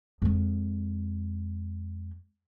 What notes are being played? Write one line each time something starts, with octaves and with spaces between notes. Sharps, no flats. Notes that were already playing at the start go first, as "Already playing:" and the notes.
F2 G#3